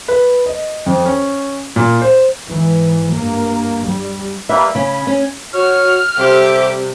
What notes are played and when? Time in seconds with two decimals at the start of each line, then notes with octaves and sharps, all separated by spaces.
0.08 B4
0.46 D#5
0.86 F2
1.05 C#4
1.76 A#2
2.01 C5
2.48 G#2 E3
3.11 G2 A#3
3.83 G3
4.49 G3 A#3 B4 E5
4.75 C#3 C#4 B5
5.07 C#4
5.53 F#4 C#5 F6
6.18 C3 G3 G4 A4 C5 E5